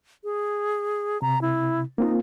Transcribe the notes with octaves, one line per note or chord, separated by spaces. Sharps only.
G#4
C3 A#5
E4
A#3 C4 D#4 F4